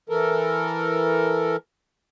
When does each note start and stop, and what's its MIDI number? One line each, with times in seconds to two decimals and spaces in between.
0.09 1.56 52
0.09 1.56 69
0.09 1.56 70